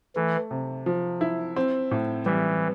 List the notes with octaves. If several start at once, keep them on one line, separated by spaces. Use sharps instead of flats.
E3 A3
C3
F3
E4
C4
A2
E3 G3